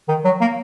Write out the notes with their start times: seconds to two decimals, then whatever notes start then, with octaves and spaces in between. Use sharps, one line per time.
0.08 D#3
0.25 F#3
0.41 A#3